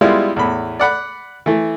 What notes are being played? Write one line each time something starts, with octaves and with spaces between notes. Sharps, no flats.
G3 G#3 B3 E4 F4
E2 A2 B5
D5 F#5 B5 D6
E3 A3